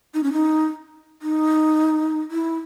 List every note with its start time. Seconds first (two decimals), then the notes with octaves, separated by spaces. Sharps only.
0.14 D#4
0.23 C#4
0.33 D#4
1.22 D#4
2.31 E4